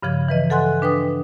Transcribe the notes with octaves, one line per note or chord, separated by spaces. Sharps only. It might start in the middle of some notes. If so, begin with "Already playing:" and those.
G2 C#3 F3 G#6
E3 B4 D#5
A4 F#5 G#5 C6 F#6
D4 B4 G5 D#6